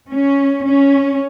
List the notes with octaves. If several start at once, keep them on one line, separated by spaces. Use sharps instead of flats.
C#4
C#4